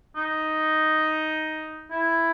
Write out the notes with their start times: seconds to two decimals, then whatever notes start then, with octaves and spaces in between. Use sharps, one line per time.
0.16 D#4
1.90 E4